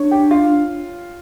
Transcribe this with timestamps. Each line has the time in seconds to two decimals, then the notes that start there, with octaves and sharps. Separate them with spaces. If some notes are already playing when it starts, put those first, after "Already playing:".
Already playing: D4 C#5 C#6
0.11 G4 G5
0.31 F4 F5